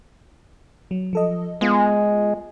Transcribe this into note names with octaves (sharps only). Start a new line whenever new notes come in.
F#3
F3 A4 D#5
G#3 B3 F4